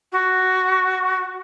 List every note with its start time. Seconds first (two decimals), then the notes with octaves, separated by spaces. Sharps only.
0.12 F#4